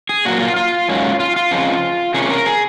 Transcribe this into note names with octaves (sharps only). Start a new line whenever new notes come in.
G#4
A#2 F#3 A#3 F#4
F4
F4
G#2 F#3 A#3 C#4
F4
F4
F2 C#3 F3 G#3
C3 F3 A#3 C#4 G#4
A#4
G#4